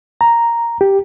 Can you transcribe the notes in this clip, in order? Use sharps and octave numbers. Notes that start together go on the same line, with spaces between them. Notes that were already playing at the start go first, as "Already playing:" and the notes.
A#5
G4